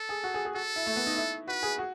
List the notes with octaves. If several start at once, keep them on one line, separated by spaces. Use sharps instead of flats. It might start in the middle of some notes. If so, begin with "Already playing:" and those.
Already playing: A4
G#4
F#4
G#4
G#4
F#4 A4
E4
A3
B3
D#4
E4
F#4 B4
G#4
F#4